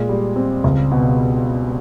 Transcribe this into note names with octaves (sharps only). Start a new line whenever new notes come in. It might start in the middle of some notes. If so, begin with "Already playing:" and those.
Already playing: A#2 G#3
G3
C4
C#2
B2